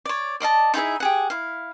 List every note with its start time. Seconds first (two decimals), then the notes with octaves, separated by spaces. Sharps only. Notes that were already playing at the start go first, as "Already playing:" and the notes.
0.05 C#5 D5
0.40 D5 D#5 F5 A5
0.74 D#4 E4 G#4 E5
1.00 G4 G#4 F#5
1.30 E4 F5